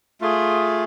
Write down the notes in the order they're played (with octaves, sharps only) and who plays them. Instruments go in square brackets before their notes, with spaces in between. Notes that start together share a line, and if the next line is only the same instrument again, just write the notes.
[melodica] A3 F4 G#4